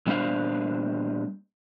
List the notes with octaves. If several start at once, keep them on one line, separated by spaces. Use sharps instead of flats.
A#2 G3 B3 D4 C5 F5